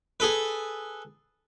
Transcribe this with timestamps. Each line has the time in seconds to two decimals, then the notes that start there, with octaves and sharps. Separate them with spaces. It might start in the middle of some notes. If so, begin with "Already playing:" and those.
0.20 G#4 A4 B4